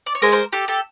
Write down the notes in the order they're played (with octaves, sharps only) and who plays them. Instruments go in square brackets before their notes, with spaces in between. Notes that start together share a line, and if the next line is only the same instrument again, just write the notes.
[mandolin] D5
C#5
[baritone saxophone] G#3 [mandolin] A#4 C5
[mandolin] A#4 C5
G4 A4
G4 A4